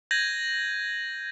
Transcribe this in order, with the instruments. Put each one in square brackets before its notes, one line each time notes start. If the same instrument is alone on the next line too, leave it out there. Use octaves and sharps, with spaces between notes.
[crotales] G6 G#6 A#6 D#7 F#7